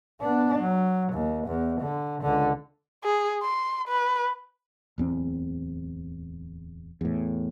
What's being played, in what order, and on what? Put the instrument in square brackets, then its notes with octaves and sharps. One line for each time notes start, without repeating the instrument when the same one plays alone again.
[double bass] B3 D4
F#3
D#2
E2
D3
C#2 D3
[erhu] G#4
C6
B4
[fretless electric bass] D1 E2 C4
E2 A2